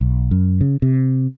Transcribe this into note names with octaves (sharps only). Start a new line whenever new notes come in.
B1
F#2
C#3
C3